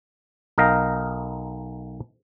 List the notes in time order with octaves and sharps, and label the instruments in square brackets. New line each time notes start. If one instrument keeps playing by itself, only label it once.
[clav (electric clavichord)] B1 A#4 D#5 F5 G5 A#5